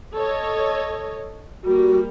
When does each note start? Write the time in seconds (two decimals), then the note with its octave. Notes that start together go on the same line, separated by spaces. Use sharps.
0.14 A4 C#5 D#5
1.65 G3 A#3 F#4